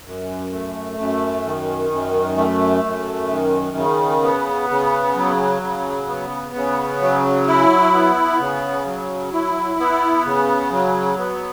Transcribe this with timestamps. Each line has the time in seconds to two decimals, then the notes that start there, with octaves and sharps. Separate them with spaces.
0.05 F#2
0.52 A3
0.98 F#2
1.45 D#3
1.91 F#2
2.37 A3
2.84 F#2
3.31 D#3
3.77 C#3
4.23 B3
4.70 C#3
5.16 F#3
5.62 C#3
6.08 B3
6.55 C#3
7.01 F#3
7.48 E4
7.93 B3
8.40 C#3
8.86 F#3
9.33 E4
9.80 B3
10.25 C#3
10.71 F#3
11.18 B3